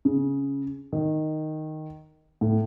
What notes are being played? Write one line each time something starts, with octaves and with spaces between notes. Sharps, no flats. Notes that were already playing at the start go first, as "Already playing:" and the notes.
C#3
D#3
A2